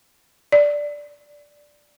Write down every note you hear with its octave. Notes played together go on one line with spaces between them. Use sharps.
D5